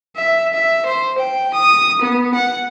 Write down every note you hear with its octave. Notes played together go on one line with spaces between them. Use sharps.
E5
E5
C5
G5
D#6
B3
F#5